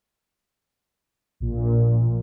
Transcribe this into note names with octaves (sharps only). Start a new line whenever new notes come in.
A#1 A#2